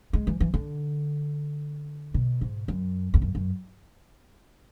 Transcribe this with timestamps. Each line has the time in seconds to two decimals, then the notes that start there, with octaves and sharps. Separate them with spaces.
0.13 G#3
0.27 E3
0.40 E3
0.54 D3
2.14 B2
2.41 G#2
2.68 F#2
3.14 E2
3.22 F#2
3.35 F#2